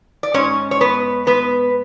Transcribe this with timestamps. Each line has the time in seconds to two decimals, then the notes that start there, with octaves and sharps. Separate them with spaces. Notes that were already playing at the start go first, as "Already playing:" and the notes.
0.23 D5
0.34 G#2 C#4 C#5
0.71 C#5
0.81 B3 B4
1.27 B3 B4